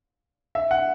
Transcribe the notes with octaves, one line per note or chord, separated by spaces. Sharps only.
E5
F#5